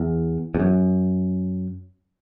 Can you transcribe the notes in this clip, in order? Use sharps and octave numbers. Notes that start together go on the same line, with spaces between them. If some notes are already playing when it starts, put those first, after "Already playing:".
Already playing: E2
E2
F#2